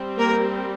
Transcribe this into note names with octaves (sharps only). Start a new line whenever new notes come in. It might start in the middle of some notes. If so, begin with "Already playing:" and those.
Already playing: G3 C4
A#3 A#4